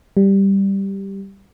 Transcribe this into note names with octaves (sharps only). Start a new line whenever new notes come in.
G3